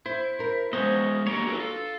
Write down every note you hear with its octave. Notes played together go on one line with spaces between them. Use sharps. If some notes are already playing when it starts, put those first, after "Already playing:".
E4 C5
A#4 C5
G#3 B3 C5 C#5 D#5
A#3 D4 G4 A4 A#4 C#5
F#4 A4 B4
F4 A4